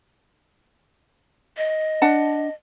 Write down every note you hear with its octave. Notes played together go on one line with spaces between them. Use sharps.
D#5
D4 F#5 A5